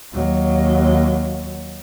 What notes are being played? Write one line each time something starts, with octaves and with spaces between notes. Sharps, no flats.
D#2 F#3